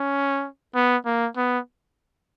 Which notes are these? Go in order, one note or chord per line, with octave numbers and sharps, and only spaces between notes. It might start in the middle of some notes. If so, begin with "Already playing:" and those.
Already playing: C#4
B3
A#3
B3